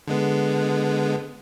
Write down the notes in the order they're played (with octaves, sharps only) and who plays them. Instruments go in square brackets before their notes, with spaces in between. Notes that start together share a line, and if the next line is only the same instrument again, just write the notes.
[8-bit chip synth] D3 G#3 B3